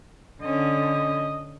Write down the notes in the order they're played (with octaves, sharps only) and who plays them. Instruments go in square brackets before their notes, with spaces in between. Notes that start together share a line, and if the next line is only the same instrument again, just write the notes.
[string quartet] D3 C#4 [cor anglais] D#5